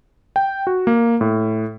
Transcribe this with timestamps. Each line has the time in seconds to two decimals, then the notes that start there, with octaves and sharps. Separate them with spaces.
0.36 G5
0.67 F#4
0.87 A#3
1.21 A2